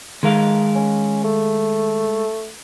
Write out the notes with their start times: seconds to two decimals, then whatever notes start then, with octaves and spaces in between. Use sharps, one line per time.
0.23 D#3 G#3 A#4 F5
0.75 C#4
1.24 A3